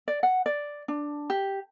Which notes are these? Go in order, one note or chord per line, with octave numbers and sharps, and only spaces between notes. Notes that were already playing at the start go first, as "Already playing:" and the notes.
D5
F#5
D5
D4
G4